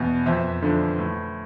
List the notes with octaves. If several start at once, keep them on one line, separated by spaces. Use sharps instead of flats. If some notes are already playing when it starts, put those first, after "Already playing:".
Already playing: E2 B2
F2 C5 E5
D3 F3
A2